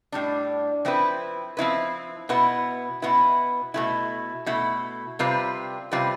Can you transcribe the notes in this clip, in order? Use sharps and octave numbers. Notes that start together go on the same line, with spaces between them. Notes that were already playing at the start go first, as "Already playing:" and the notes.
A2 G3 D4
F3 C4 E4 B4
F3 C4 E4 B4
B2 B3 E4 B4
B2 B3 E4 B4
B2 A3 E4
B2 A3 E4
C3 G3 C4 F4 B4
C3 G3 C4 F4 B4